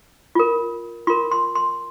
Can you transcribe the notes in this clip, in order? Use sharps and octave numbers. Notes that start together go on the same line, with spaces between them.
F4 A#4
F4 A#4 C6
C6
C6